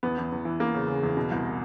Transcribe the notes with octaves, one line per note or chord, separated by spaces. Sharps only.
E2 B3
E2
E2
E3
E3 A#3
C#3
C#3
E2
B2
C2